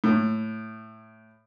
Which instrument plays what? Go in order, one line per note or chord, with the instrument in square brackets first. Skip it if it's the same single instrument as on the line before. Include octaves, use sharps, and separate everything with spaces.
[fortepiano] A2